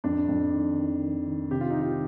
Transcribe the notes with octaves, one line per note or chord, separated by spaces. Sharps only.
F2 D4
F2
D#3
D#3
D#3
D#3
C3 G4
F4
D#3 D#4
F4